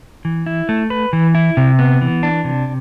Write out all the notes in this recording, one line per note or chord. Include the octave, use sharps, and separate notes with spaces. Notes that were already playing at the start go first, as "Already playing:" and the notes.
E3
E4
A3
B4
E3
E4
C3
B3
E3
D4
C3